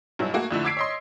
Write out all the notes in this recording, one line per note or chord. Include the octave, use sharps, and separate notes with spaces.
G2 B2 F#3 G#3 E4
A3 A#3 F#4 G#4
F2 D3 A3 E4
D6 E6 G#6 B6 C7 D7
C#5 D#5 C6